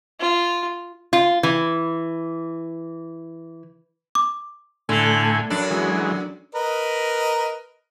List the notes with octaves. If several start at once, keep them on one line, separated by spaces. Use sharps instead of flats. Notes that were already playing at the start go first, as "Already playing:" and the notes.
F4
F4
E3
D6
A2 D3 A3 G#5
F#2 D4
E3 F#3 G#3
A#4 B4 D#5